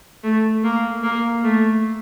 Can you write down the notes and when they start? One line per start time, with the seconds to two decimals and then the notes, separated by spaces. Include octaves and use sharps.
0.24 A3
0.64 A#3
1.03 A#3
1.43 A3